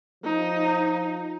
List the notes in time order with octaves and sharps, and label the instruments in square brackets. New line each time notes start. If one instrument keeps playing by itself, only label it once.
[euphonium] F3 [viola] D#4